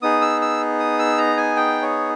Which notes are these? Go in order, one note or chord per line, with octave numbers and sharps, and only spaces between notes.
B3 D#4 G#4 D#6
E6
E6
D#6
E6
A#5
G#5
G5
C#5